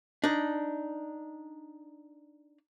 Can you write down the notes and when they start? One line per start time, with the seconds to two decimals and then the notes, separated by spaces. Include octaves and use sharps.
0.24 D4 D#4